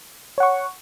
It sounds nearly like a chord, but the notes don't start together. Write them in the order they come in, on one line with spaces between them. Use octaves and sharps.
C#5 F#5 C#6